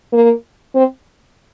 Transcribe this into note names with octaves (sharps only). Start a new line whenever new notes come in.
A#3
C4